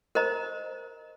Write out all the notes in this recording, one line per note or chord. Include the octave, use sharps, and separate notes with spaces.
A#4 C5 D#5 A#5